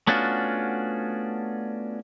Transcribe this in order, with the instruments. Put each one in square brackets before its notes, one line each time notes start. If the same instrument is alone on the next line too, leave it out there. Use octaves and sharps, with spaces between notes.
[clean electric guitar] A3 B3 C#4 D4 F4 F#4